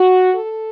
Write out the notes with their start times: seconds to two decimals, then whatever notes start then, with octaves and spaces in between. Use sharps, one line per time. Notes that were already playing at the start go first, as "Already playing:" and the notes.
Already playing: F#4
0.33 A4